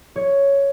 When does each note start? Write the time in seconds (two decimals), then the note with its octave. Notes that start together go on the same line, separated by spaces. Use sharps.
0.16 C#5